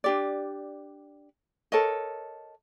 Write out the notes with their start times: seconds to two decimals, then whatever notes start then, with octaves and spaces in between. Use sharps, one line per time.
0.04 D4 G4 D5
1.72 A4 A#4 C#5 D#5